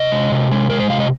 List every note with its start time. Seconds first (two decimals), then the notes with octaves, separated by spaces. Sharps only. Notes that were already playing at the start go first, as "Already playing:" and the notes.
Already playing: C3 D#5
0.12 G#3
0.32 C3
0.51 G#3
0.70 G#3 A#4
0.79 C5
0.89 C3 F5
1.00 D#5